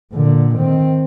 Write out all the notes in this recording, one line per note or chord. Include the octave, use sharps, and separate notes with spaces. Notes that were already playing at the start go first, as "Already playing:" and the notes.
A#2 D3
D#3 C4